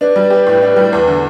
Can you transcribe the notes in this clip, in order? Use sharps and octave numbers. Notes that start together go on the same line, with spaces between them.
D4 B4
G3
G4
A2
D4
G3
E2 B4
D3